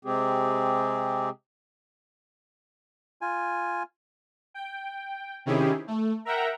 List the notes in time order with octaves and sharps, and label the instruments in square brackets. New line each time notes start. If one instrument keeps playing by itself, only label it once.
[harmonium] C3 G#3 C4 G4 G#4
[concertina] F4 G#5
[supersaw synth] G5
C3 D#3 C#4 E4 G4 G#4
A3
A#4 E5 F#5 G5 A#5